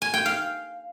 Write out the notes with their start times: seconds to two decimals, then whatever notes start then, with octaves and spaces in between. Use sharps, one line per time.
0.02 G#5
0.14 G5
0.26 F5